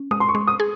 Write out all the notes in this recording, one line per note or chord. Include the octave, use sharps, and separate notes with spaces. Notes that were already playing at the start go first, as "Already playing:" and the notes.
Already playing: C#4
G#3 D#6
C6
C#6
G#3
D#6
G#4